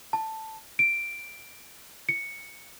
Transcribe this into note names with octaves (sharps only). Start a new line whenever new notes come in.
A5
D7
C#7